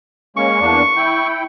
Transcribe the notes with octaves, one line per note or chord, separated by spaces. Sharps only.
G#3 A#3 C#4 C#6
E2 A#3 D4
E4 G5